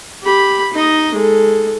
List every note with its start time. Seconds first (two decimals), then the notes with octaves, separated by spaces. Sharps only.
0.22 G4 B5
0.74 D#4 D#5
1.14 G#3 A4